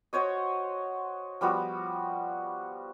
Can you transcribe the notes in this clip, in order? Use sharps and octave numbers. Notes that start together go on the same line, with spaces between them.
F#4 C5 C#5 D#5
F3 G3 B3 F#4